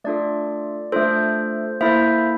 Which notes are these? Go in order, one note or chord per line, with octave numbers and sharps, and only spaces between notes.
A3 D4 F4 A4 D5
A3 D4 F4 A4 C5
A#3 E4 A4 C5 E5